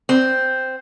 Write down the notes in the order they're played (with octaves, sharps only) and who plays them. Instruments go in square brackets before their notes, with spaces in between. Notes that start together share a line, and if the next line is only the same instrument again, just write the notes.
[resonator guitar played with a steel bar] C4